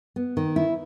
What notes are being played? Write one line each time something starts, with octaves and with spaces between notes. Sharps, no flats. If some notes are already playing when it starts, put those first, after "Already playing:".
B3
D#3
E4